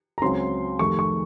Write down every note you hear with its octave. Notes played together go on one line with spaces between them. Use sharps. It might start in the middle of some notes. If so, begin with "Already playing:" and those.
A#5
C#2 C#3 F#3 C4 C6
F2 C3 D#3 A3 C#6
C#6